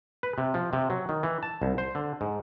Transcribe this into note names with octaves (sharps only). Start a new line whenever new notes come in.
B4
C3
F3
C3
F#3
D#3
E3
A5
C2
C5
D3
G#2